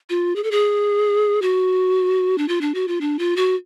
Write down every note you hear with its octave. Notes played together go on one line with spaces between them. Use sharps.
F4
G#4
A4
G#4
F#4
D4
F4
D4
F#4
F4
D4
F4
F#4